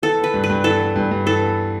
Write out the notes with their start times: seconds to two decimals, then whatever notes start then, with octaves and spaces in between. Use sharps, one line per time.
0.02 E3 A4
0.19 B3 B4
0.34 G2
0.44 B4
0.49 G2
0.64 E3 A4
0.80 B3
0.96 G2
1.11 G2
1.26 E3 A4
1.42 B3